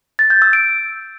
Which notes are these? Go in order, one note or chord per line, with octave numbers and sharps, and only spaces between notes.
A6
G6
E6
D7